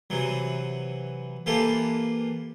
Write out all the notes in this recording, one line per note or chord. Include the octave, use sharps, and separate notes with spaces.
C3 E3 F#3
E3 A#3 F4 G4 A4